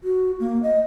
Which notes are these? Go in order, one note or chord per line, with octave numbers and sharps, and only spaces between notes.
F#4
A#3
D#5